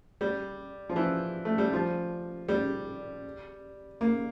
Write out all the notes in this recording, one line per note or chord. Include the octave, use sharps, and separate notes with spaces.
G3
F3
E3
A3
G3
F3
G3
A#3